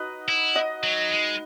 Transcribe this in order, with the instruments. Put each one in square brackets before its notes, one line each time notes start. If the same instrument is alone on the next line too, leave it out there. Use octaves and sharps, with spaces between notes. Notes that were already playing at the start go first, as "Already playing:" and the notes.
Already playing: [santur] D#4 F#4 B4 D#5
[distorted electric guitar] E4
[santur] D#5 F#5
[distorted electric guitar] F#3
G#3